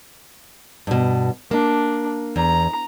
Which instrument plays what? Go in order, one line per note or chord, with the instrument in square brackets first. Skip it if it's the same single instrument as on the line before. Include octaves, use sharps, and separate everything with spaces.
[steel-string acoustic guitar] G2 B2
[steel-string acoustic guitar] A#3 [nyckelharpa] D4
[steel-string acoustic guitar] E2 [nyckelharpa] A#5